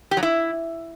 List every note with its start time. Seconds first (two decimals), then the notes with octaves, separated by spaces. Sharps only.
0.11 G4
0.17 F#3
0.23 E4